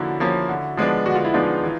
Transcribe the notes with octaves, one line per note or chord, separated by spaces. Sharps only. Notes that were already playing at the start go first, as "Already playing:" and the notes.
Already playing: D3 F3 A#3 C#4 E4 F#4
F3 A#3 C#4
D3
F3 G#3 B3 D4
D3 F#4
F4
E4
F3 G#3 B3 D4 D#4 F4
E3